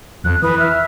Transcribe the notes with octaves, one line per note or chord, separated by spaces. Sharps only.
F2 F#6
E3 B4 D#6
E5 F6